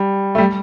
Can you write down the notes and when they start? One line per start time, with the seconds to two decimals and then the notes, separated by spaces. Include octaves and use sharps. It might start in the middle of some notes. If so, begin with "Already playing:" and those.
Already playing: G3
0.35 A3
0.38 G3